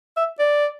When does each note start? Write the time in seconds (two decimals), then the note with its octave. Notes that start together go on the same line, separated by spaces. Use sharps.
0.17 E5
0.39 D5